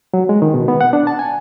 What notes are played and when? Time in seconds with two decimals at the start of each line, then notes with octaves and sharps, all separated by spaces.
0.14 F#3
0.29 G#3
0.42 D#3
0.54 B2
0.68 B3
0.81 F#5
0.93 D4
1.07 A5
1.19 G#5